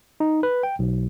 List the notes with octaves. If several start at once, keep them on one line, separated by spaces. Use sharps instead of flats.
D#4
B4
G5
B1